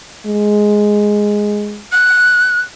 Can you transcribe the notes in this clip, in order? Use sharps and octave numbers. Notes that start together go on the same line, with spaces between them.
G#3
F#6